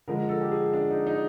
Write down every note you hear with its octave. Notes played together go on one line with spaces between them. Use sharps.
D3 F3 G#3 A#4
A4
G4
G#4
D4
D#4
D#4